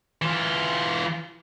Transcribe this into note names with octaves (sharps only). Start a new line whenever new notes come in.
E3 F4